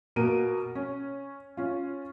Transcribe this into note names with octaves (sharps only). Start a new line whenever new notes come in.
B2 A#3 A#4 D7 D#7
C#4
C#4 F4